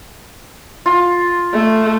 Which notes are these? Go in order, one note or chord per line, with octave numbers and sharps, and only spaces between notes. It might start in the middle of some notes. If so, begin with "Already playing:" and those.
F4
A3